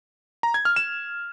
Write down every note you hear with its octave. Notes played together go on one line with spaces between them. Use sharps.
A#5
G#6
F6
E7